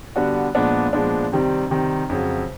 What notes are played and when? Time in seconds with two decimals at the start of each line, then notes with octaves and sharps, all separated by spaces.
0.16 D3 G3 B3 D4 F#4
0.55 A#2 F3 G#3 B3 D4
0.93 A#2 F3 G#3 B3 D4
1.32 C3 D#3 G3 C4
1.70 C3 D#3 G3 C4
2.09 F2 C#3 F#3